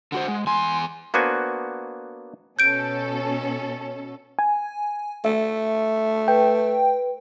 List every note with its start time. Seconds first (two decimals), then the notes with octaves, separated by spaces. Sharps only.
0.12 D3 F#4 C5 F#5
0.28 G#3
0.47 E2 G#5 C6
1.14 A#3 B3 D4 F#4 C5 G#5
2.59 B2 C#4 A4 G6 D7
4.39 G#5
5.25 A3 E5
6.28 B4 G5